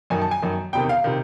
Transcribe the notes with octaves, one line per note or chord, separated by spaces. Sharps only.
F#2 D#3 G#5
A5
G#5
F#2 D#3
E2 C3 D#3 G5
F5
C3 D#3